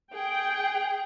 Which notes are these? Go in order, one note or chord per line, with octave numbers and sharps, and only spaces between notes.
G#4 G5